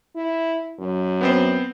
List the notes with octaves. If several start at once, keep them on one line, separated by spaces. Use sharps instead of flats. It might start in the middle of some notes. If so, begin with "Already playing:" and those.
E4
F#2
B3 C4 C5